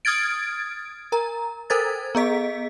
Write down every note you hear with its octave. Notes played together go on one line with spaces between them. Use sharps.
D#6 F6 G#6 A6 D7
A#4 A#5
A4 A#4 C5 G#6 A6
B3 G#4 D#5 B6